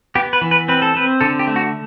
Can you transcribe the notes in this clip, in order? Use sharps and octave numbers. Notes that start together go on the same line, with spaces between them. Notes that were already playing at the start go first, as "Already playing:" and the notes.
B3 G4
B4
E3
B4
C4 B4
A4
C4 B4
D3 A4
G4
A3
F#4